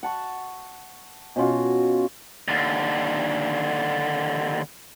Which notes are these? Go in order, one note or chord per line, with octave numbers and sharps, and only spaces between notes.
F#5 A5 C#6
B2 C#4 F4 F#4
D#2 D3